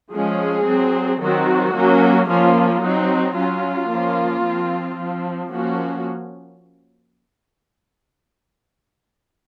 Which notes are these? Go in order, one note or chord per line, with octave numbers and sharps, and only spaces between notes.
F3 G#3 C#4 G#4
F#3 C4
D#3 F#3 C4 F#4
F#3 A#3 C#4
F3 A#3 C#4 F4
F#3 C4 D#4
F#3 C#4 F4
F3 A#3 C#4
F3 C4
F3 C4
F3 A#3 C#4 F#4